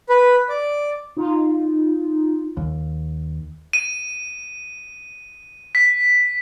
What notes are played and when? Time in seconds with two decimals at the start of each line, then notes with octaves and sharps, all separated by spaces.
0.09 B4
0.49 D5
1.17 D#4 F4
2.57 D#2
3.73 D#7
5.75 B6